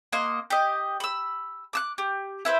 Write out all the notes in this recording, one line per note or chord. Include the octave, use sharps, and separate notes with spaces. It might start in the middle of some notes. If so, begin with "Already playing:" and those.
A#3 D#5 F#5 C6
G4 D#5
B5 E6
D6 E6 F#6
G4
E4 B4 C5